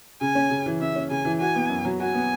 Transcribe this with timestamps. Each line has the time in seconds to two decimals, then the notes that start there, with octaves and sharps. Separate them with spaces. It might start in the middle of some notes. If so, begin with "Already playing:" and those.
0.21 C#3 G#5
0.35 C#4
0.50 C#3
0.66 E3
0.80 C#3 E5
0.96 C#4
1.10 C#3 G#5
1.25 E3
1.40 F#4 G#5
1.56 B3
1.70 F#2
1.85 F#3
2.00 F#4 G#5
2.15 B3